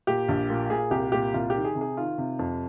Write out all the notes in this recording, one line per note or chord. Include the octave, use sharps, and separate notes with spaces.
A#2 G4
A#1
A#2
A#2 G#4
C2 G4
A#2 G4
C2 F4
G4
D#3
G#4
C3
G#4
D#3 F4
C3
F2